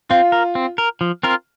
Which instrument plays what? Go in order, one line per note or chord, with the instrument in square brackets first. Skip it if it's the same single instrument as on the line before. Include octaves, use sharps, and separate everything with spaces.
[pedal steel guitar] C4 [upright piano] F4
[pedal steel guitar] A#4
C4
A#4
F3
C4 F4 A#4